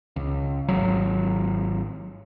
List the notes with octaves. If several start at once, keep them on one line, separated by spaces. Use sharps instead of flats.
C#2
G#1 F#3